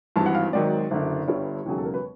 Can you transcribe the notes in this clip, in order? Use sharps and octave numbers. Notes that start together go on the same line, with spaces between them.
G#1 G2 E3 A5
F#5
F5
G#1 G#2 D#3 F#3 D5
F#1 F#2 D3
G1 G2 D3 G3 C#5
E1 D#2 C#3 F#3 G#4
A4
A#4
B4